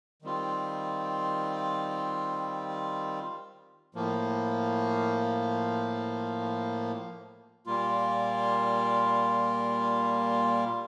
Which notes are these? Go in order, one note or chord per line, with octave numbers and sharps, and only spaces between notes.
D#3 G3 C4 F4
A2 F3 A#3
A#2 G3 A#3 F4